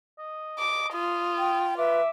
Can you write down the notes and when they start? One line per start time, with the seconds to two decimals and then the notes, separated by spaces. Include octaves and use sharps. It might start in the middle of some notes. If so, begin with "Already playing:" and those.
0.18 D#5
0.59 D6
0.94 F4 D#6
1.38 G5
1.78 B4 E5 D6